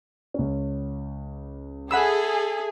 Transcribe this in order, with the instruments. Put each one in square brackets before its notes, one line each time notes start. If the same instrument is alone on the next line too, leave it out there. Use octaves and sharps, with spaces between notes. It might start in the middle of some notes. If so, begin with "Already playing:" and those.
[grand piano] C#2 C#4
[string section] G#4 [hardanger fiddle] A4 E5 [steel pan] F#5 B5 E6